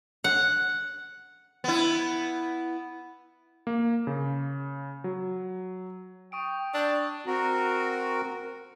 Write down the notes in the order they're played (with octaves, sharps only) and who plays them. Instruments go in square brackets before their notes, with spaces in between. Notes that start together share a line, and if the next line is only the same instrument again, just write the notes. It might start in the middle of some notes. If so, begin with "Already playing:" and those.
[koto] F#5
[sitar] B3 E4
[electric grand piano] A#3
C#3
F#3
[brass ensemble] G5 [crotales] C#6 D#6 D7
[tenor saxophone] D4 [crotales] E6 G6
[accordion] C4 F#4 A#4